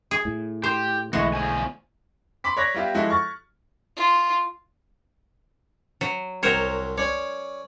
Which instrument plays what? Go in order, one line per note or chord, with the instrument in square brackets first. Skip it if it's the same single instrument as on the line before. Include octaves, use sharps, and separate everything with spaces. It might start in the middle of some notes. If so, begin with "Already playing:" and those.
[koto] G#4
[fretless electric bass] A2
[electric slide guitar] G4 [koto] C5
[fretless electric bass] B1 D3 A3 [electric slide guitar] E3 [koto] G#3 F#4
[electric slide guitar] E2 F3 G#5
[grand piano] B5 C6 D6 B6
C#5 D5 F#6 G#6 A#6
G3 B3 F4 G4 E5
F3 G#3 E4 F#4 A4
C#6 F6 A6
[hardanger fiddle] F4
[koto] F#3
[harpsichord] C2 F#3 [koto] A#4 C5 C#5
[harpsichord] C#4 D5 [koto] C#5